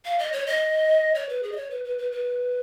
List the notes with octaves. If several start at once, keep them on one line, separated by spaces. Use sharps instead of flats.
F5
D#5
C#5
D#5
C#5
B4
G#4
D#5
C#5
B4
B4
B4
B4